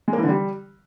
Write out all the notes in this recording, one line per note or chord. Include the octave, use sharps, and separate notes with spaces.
G#3
A#3
E3
D3
G3